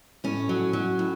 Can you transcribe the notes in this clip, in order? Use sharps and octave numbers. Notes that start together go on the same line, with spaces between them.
A2 C#4
F#3
F#3
A2